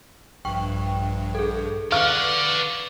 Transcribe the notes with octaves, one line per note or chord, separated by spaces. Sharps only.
A#1 G2 G5 C#6
G#4 A4
B4 D5 F5 F#5 C#6 F6